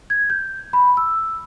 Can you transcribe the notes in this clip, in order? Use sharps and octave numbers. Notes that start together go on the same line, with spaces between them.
G#6
G6
B5
E6